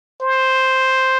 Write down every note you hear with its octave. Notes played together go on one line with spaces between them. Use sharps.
C5